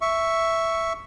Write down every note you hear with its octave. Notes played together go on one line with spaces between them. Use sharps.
E5 C#6